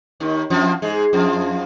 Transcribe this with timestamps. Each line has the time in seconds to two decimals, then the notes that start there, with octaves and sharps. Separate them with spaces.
0.20 D#2 D#3
0.50 F2 F3
0.82 G#2 G#3
1.13 F2 F3